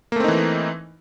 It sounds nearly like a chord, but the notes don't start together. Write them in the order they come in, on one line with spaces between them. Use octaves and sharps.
A#3 A3 C4 D#4 E3